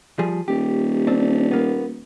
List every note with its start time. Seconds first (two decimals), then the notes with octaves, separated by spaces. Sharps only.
0.19 F3 G3 G#4
0.48 D#1 G4
1.07 C4 D4
1.52 A#3 B3